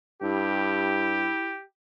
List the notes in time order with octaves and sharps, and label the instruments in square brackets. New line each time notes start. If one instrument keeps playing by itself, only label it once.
[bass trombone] G2 [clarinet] E4 [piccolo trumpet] G4